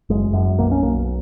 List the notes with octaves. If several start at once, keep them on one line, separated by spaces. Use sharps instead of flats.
F#1 G#3
F#2
B1 A#3
C#4
B1 A#3